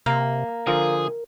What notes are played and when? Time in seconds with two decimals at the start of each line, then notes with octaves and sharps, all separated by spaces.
0.06 C3 A#3 F5
0.67 D3 F3 F4 G#4 A#4